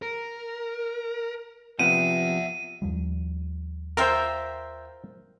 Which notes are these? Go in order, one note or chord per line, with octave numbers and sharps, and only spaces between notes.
A#4
C3 F3 B3 E5 F#5 D#7
D#2 F3 G3
F4 A#4 C5 E5 G5